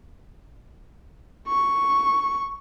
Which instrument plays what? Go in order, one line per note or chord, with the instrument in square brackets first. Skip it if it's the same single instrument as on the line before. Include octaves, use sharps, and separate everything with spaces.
[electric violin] C#6